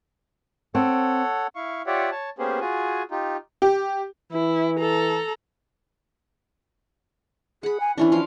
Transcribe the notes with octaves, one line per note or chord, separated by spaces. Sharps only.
C4 A4 C#5 F#5
E4 F5 C#6
F4 G4 C#5 D5 E5 F#5
C#5 A5
A#3 B3 C#4 G4 G#4 C5
F4 F#4 G#4 G#5
D#4 F4 G4
G4
E3 E4
A4 A#5
G#4 F#5 B5
G#5
E3 C#4 D4 E4
F3 F5 C6